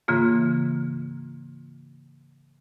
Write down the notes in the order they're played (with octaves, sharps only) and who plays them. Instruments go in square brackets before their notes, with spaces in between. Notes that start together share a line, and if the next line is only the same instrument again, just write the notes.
[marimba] G#2 C#3 E3 A#3 F4